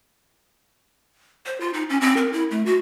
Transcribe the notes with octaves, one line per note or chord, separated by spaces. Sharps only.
C5
F4
D#4
C#4
C4
A#4
E4
A3
F#4